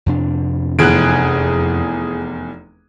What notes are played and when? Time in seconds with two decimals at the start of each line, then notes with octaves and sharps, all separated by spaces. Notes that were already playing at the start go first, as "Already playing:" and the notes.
0.06 F2 C3 D4
0.79 F1 E2 G#4 F#6 G#6 D7